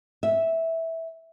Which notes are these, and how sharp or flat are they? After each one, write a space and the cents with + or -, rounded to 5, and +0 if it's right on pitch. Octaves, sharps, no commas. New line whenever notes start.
E5 -10